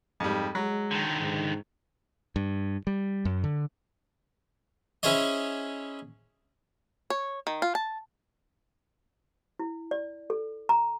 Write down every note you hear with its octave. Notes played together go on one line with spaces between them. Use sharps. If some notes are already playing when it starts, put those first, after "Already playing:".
F2 G#2 G3
F#3 G#3
D3 D#3
G#2
G2
G3
F#2
D3
C#4 E4 G#4 C5 C#5 D#5
C#5
D#3
F4
A5
E4
D5
A4
A#5